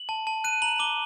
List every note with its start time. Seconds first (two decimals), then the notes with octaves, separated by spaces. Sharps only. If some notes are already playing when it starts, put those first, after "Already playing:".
Already playing: F#7
0.09 A5
0.27 A5
0.44 F#6 D#7
0.62 A#5 F#7
0.79 D6 G7